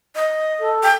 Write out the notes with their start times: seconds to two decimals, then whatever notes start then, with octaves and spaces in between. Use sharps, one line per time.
0.16 D#5
0.59 A4
0.83 G5